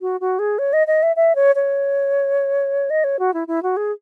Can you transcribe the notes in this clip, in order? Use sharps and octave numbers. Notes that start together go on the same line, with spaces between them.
F#4
F#4
G#4
C#5
D#5
D#5
E5
E5
C#5
C#5
D#5
C#5
F#4
E4
E4
F#4
G#4